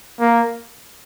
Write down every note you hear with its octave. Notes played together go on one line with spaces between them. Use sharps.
A#3